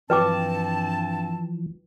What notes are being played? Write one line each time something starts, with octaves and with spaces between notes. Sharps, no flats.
G2 E3 F3 C4 B4 G5 A5 D6